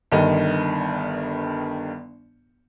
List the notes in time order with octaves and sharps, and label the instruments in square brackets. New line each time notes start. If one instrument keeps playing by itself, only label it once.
[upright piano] G1 G2 D#3 D#5